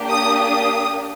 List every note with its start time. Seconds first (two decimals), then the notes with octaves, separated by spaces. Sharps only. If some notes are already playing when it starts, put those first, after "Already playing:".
Already playing: A#3 D4 G4
0.10 D#6
0.39 D#6